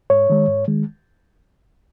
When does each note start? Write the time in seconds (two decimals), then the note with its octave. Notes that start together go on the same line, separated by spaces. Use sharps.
0.10 G#2 C#5
0.30 D#3 G#3
0.48 G#2
0.68 D#3 G#3